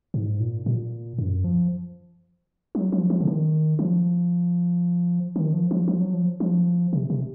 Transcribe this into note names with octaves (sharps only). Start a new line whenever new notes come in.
G#2
A#2
A#2
F#2
F3
F#3
F3
F3
C#3
D#3
F3
D#3
F3
F3
F3
F#3
F3
F3
C3
C3